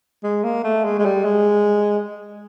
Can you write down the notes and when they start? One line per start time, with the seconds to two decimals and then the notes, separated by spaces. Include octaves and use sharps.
0.24 G#3
0.44 A#3
0.64 A3
0.84 G#3
0.99 G#3
1.05 G3
1.25 G#3